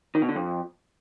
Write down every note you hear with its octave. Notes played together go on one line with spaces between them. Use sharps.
D#3
B2
D3
F2